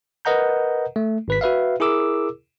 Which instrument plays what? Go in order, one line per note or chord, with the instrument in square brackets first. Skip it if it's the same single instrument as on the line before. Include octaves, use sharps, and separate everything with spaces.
[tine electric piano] A#4 B4 D#5 F#5 A#5 G6
A3
G#1 B4 B6
F#4 B4 E5 F5
E4 G#4 A#4 D6 E6